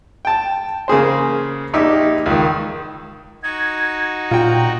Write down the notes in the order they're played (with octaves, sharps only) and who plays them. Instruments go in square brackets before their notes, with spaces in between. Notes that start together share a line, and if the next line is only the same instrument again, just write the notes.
[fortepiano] G5 A5
C#3 A#3 G#4 C5
A#1 D#4 G4 E5
C#2 D#3
[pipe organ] D#4 F#4 [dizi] G#6
[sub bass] A#2 [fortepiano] F4 G5 [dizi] A#5